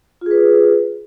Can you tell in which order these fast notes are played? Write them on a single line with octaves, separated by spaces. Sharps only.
F4 G#4 B4